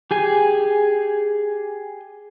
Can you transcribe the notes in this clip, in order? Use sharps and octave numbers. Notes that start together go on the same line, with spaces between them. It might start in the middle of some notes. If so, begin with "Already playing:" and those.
G4 G#4 G#5